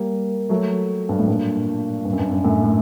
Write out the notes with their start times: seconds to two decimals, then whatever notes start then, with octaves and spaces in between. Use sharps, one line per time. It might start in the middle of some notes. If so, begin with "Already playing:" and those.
Already playing: G3 A#3
0.49 F#3 A3
1.09 G2
1.19 A2
1.28 G2 A#2
2.05 G2
2.13 F#2
2.19 G2
2.31 F#2
2.44 F#2 A2
2.63 A2